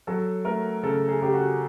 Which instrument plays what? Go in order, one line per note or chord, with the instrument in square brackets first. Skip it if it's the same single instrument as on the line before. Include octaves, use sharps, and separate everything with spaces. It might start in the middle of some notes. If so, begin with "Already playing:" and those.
[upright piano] F#3 A4
A3 A#4
C#3 A4
G#4
C#3 G4
F#4